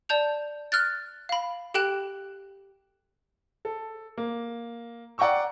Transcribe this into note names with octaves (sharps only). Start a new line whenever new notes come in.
D5 A5 G6 F7
F6 F#6 A6
F5 B5
G4 A4 G5 F#6 E7
A4
A#3
D5 F#5 G5 A#5 C#6 E6